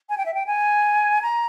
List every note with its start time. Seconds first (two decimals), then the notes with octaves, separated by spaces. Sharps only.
0.09 G#5
0.18 G5
0.26 E5
0.34 G5
0.46 G#5
1.22 A#5